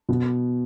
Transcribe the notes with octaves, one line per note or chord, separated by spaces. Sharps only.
B2